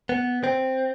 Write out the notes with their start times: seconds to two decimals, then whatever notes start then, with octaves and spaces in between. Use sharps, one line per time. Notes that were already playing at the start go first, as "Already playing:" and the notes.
0.09 B3
0.44 C4